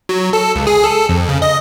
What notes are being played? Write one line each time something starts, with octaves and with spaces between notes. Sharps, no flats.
F#3
A4
C#2
G#4
A4
F2
C#3
D#5